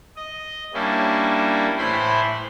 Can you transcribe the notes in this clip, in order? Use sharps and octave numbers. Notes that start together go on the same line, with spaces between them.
D#5
G3 A#3 C#4 D4 E4
A2 E3 E4 C5 B5 C6